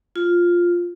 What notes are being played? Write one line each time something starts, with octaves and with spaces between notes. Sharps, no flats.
F4